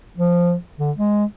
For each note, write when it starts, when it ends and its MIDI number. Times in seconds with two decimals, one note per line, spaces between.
0.17 0.54 53
0.79 0.91 50
0.97 1.24 56